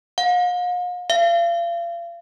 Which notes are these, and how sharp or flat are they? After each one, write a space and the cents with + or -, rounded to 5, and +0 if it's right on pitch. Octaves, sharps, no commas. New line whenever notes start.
F5 +40
F5 -35